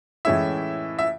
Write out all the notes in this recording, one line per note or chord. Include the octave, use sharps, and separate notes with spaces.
A2 E3 G#3 C#4 E4 E5
E5